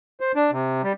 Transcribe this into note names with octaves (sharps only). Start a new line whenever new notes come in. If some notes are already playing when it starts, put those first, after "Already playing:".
C5
D4
C3
G3